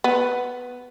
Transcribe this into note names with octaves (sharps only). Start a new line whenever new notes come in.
B3